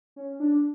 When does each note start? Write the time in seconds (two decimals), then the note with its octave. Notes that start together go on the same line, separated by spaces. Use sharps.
0.16 C#4
0.40 D4